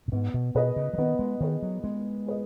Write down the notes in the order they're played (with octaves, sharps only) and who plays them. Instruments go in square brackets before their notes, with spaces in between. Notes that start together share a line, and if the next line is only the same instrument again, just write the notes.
[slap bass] B2
[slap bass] G#2 [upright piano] B3
[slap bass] B2
[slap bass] B2 [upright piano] G#4 B4 D#5
[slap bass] C#3
F#3
[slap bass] D#3 [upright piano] B3
[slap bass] G#3
[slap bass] D#3 [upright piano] G#4 B4 D#5
[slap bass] F#3
[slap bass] G#3 [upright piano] B3
[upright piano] G#4 B4 D#5